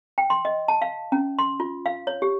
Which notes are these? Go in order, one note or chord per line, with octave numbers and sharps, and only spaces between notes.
G5
C6
D#5
A5
F5
C#4
C6
F4
F5
C#5
G4